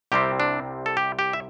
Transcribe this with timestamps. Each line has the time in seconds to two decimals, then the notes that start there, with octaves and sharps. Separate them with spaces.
0.12 C2 C3 G3 C4 G4
0.40 D4
0.86 A4
0.97 G4
1.19 G4
1.33 E5